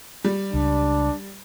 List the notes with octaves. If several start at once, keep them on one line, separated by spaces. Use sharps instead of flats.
G3
C#2 D4